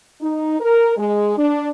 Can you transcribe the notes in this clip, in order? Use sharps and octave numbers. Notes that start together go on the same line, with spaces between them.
D#4
A#4
G#3
D4